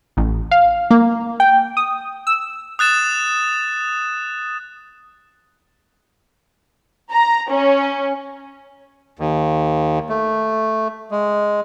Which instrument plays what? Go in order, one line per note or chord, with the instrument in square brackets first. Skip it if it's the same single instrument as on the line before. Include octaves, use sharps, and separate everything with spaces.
[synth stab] A1
F5
A#3
G5
D#6
E6
[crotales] D#6 F#6 A6 E7
[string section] A#5
C#4
[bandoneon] D#2
A3
G#3